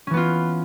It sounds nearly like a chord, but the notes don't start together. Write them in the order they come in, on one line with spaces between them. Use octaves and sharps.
C#4 E3 B3 F4